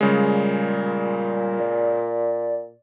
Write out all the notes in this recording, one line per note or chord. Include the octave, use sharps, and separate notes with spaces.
A#2 C#3 G3 G#3
D5